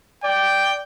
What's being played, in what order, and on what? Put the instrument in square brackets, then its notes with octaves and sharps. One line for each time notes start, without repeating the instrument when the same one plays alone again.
[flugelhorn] D5 [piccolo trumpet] G5